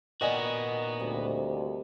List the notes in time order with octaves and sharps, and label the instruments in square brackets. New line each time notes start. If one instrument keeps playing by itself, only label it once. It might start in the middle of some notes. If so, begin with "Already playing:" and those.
[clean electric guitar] A#2 B3 F#4 [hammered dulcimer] D#3 [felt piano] D5 D#5 G#5
[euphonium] D2 [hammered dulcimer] C3 G3